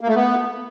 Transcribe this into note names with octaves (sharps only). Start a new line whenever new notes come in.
A#3
A3
B3